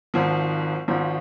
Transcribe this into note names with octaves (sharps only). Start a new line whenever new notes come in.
G#1 G#2 F3
G#1 G#2 F3